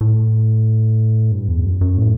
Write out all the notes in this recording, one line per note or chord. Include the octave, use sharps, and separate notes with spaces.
A2
G2
E2
F#2
F#2
A2